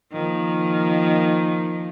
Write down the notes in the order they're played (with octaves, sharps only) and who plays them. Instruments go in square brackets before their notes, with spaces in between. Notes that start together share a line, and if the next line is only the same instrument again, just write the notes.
[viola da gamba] D#3 F3 A#3